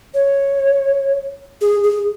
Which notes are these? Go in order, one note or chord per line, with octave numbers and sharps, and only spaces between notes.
C#5
G#4
G#4